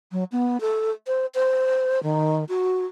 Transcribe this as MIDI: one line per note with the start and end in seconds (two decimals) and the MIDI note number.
0.12 0.24 54
0.32 0.60 59
0.61 0.91 69
1.07 1.26 72
1.35 2.02 72
2.03 2.45 51
2.49 2.85 66